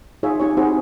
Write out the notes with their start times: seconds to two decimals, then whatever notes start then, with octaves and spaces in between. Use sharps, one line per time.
0.23 D#4 F4 G#4 C#5 E5
0.40 C#4 D#4 G4 C#5
0.57 C4 D#4 E4 F#4 G#4 C5